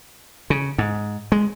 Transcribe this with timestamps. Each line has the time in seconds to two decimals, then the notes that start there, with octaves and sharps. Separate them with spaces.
0.50 C#3
0.78 G#2
1.32 G#3